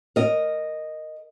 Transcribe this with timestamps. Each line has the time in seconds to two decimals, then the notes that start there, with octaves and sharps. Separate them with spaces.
0.16 A#4 D#5